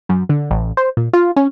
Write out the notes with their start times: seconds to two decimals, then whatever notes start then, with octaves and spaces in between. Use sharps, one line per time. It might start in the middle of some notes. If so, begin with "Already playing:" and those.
0.09 F#2
0.29 D3
0.51 A1
0.77 C5
0.97 A#2
1.13 F4
1.36 C#4